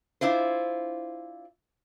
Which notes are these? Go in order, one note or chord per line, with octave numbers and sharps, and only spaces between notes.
D4 E4 F4 C5